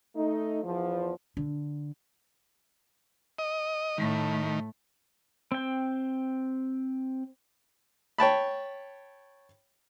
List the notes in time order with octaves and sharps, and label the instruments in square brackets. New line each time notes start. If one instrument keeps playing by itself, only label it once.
[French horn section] A3 D#4
E2 F3
[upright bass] D3
[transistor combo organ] D#5
[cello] A2 A3 [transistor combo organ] D#3
[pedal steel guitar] C4 G5
[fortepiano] C#5 G5 A5 B5